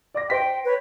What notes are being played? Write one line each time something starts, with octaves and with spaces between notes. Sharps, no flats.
D5 D6 A#6
C5 G5 A#6 B6
B4 C#5